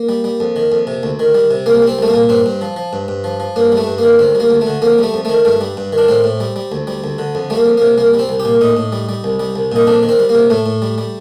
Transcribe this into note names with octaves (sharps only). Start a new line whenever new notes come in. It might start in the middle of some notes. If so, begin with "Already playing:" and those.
Already playing: A#3
G3
G3
F2
D#3
F2
C3
D2
D#3
G3
C3
C2 A#3
G3
C4
C2 A3
A#3
A#2
G2 C4
G2
F3
F3
G2
G2
F3
F3
G2 A#3
G3
A3
G2
D#3 A#3
D2 C4
G3
A#3
D2
A3
D3
F2 A#3
G3 A3
F2
D#3 A3
G2 A3
G3
G2
D#3
D4
A2 C4
A2
G3
G3
D2
G3
D2
D3
F2
G3 A3
A#3
F2
C3 A#3
C2 A#3
G3
C4
C2
G4
A#2
A2 D#4
A2
G3
G3
C2
G3
C2
A#2 D#4
F2 D4
D#3
C4
G3
A#3
C3
A2 A3
A2
G3
G3